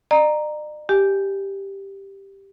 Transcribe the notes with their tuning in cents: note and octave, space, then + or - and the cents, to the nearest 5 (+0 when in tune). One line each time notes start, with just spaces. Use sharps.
D5 +45 A#5 +0
G4 +0 G#5 +0